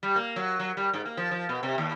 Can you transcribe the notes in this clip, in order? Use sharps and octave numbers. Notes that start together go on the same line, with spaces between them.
G3
A#3
F#3
F#3
G3
G#2
A#3
F3
F3
B2
C3
D#2